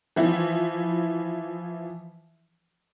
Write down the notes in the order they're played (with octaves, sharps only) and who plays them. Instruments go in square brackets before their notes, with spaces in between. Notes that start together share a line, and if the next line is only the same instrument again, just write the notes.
[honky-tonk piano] E3 F3 E4